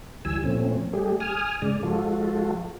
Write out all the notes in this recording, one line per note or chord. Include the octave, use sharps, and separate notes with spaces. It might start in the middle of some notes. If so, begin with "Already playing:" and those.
D2 E3 G3 G#5 E6
A#2 F3 A3 C4 C#4
G3 A3 G4 G#4
G#5 D#6 F6
G#2 C#3 G#3 D5
F3 G#3 F4 F#4 A4